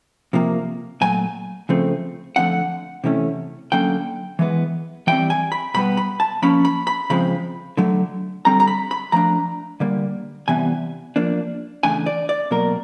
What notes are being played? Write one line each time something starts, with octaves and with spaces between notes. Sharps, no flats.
C3 F3 A#3
A#2 F#3 A3 G#5
C#3 F3 A3 C4
D3 F3 A3 C4 F#5
C3 E3 A3 C#4
D3 F#3 A#3 C#4 G5
E3 G#3 B3
E3 G3 C4 G5
G#5
B5
B2 G3 B3 B5
B5
A5
F3 A#3 C#4 B5
B5
B5
C#3 F3 G#3 C4 B5
D3 F#3 A3
D3 G3 C4 A#5
A#5
B5
B5
F3 A3 D4 A#5
D3 G3 A#3
C3 E3 G3 B3 G#5
F3 A#3 D4
C#3 E3 A3 D4 G#5
D5
D5
B2 F#3 A#3 A#4